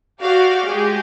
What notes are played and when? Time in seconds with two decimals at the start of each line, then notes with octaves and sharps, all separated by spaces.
0.21 F#4 G4 D5 F5
0.68 G#3 G4 G#4